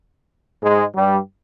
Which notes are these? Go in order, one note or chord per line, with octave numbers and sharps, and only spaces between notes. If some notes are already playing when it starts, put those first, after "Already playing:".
G#2 G#3
G2 G3